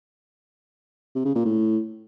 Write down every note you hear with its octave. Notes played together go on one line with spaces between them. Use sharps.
C3
C#3
A#2
A2